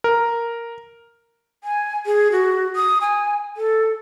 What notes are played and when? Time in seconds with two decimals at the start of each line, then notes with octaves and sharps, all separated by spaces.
0.04 A#4
1.64 G#5
2.06 G#4
2.32 F#4
2.76 D#6
3.01 G#5
3.57 A4